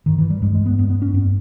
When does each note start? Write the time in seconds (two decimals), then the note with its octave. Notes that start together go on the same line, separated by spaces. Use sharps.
0.06 G2 D#3
0.18 E3
0.30 G3
0.42 G2 G#3
0.54 G#3
0.66 B3
0.78 G2 B3
0.90 B3
1.02 C#4
1.14 G2 B3